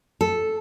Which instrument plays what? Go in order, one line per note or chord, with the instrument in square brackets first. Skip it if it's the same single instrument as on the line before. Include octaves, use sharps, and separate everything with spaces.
[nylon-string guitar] A4